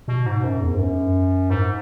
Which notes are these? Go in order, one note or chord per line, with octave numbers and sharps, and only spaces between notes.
B2
G#2
F#2
E2
G#2
F#2
G#2